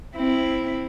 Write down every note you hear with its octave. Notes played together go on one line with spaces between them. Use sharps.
C4 E4